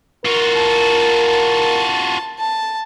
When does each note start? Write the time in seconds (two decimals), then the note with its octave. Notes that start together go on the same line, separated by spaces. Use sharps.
0.25 F4 F#4 A#4
0.54 A5
1.28 A5
2.39 A5